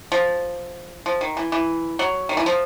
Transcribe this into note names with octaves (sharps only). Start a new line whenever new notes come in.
F3
F3
D#3
E3
E3
F#3
D#3
E3
F3